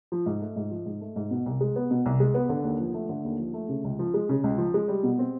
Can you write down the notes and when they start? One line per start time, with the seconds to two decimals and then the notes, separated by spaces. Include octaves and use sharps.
0.12 F3
0.26 G#2
0.41 A3
0.56 G#2
0.71 F3
0.86 G#2
1.01 A3
1.16 G#2
1.31 B2
1.46 C2
1.61 G#3
1.76 B3
1.91 B2
2.06 C2
2.20 G#3
2.34 B3
2.49 D3
2.64 D#2
2.80 F3
2.94 A3
3.09 D3
3.25 D#2
3.39 F3
3.54 A3
3.69 C#3
3.84 C#2
3.99 F3
4.14 G#3
4.29 C#3
4.44 C#2
4.58 F3
4.74 G#3
4.88 G3
5.03 B2
5.19 C4